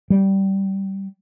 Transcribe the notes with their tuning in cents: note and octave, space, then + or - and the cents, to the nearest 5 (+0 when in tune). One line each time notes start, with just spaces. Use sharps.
G3 -15